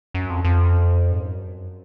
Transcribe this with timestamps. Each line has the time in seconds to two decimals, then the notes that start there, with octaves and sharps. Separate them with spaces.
0.14 F#2
0.30 F2
0.45 F2
1.12 G#2
1.21 F#2